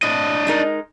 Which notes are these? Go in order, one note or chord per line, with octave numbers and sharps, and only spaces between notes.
A2 D4 D#5
G#3 D#4 A#4